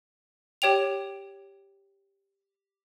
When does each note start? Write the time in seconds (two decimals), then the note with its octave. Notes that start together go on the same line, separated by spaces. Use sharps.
0.62 G4 C#5 G5 F7